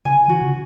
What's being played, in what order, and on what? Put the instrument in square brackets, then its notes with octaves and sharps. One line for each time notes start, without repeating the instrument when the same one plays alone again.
[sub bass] C#3 [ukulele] G#5
[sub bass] E3 [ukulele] F#4
[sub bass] C#3